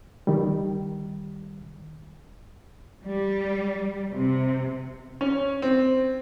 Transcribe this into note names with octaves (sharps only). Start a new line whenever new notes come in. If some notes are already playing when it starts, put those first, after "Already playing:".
D#3 G3
G3
C3
C#4
C4